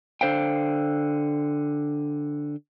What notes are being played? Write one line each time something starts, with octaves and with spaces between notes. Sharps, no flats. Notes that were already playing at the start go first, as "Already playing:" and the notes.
D3 C5 F5 G5